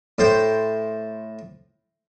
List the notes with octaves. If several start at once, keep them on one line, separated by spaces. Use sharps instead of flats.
A2 C5 G5